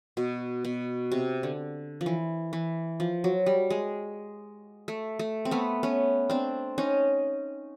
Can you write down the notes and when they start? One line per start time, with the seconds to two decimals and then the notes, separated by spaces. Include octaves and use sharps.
0.17 B2
0.65 B2
1.12 C3
1.43 D3
2.01 F3
2.06 E3
2.53 E3
3.00 F3
3.24 F#3
3.46 G3
3.70 G#3
4.88 A3
5.19 A3
5.45 C4
5.51 A3 B3
5.83 B3 C#4
6.30 C4 D4
6.78 C#4 D#4